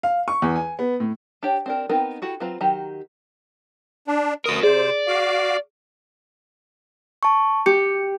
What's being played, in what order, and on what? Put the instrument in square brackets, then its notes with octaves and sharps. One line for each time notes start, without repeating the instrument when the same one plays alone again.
[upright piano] F5
C#6
E2
G#5
B3
A2
[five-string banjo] D4 G4 C#5
C4 D4 A#4
B3 C4 D#4 A#4 B4
E4 F#4 G4 A4
F#3 C4 F4 B4 A#5
D#3 F#3 G4 A#5
[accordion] D4
[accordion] D2 D#6 [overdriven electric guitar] F#4 A#4
[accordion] C3 C5 [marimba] G#4 [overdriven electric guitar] D5
[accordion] F#4 F5 D6
[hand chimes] A5 C#6
[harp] G4 [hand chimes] C#7